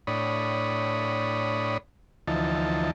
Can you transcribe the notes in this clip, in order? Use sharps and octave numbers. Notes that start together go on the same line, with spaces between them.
A2 D4 C#5 B5 D#6
D2 E3 F3 D#4 A5